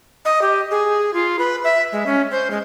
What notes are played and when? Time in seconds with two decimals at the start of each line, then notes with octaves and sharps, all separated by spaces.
0.25 D#5
0.41 G4
0.71 G#4
1.14 F4
1.39 B4
1.64 E5
1.92 G#3
2.06 C#4
2.31 C5
2.51 G#3